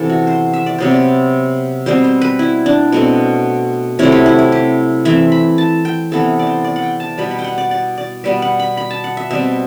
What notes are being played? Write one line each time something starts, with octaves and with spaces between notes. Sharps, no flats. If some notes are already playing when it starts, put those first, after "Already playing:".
Already playing: C3 E3 B3 A4
F#4
C5
E5
D5
C3 F#3 B3 C5
D5
B2 G3 C4 C5
C5
B4
E4
D4
B2 A3 C4
C3 F#3 A3 E4
G4
E4
E4
G4
E3 A3 C4 E5
B5
A5
G5
C3 E3 B3 A4
D5
C5
D5
F#5
G5
A5
B2 G3 B3 B5
B5
G5
F#5
D5
D5
D5
B2 G3 B3 E5
F#5
B5
B5
A5
F#5
E5
B2 G3 C4 E5